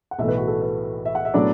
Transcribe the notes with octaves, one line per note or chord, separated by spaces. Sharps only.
F#5
B1 A2 E3 A3 E5
B4
F#4
A4
B4
E5
F#5
E5
A2 F#3 B3 D4 D5